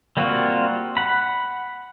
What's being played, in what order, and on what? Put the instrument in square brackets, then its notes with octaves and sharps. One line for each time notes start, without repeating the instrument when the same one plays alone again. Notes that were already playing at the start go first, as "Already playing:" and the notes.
[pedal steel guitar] G3 A#3 C4 F4 F#4
F#5 B5